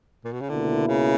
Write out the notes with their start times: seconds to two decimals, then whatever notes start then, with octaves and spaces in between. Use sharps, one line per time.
0.24 A#2
0.32 B2
0.41 C#3
0.49 C#2 B2 D3 A#3 E4
0.87 C#3